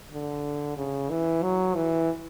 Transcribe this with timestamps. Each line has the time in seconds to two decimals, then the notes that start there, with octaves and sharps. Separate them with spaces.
0.12 D3
0.77 C#3
1.10 E3
1.43 F#3
1.75 E3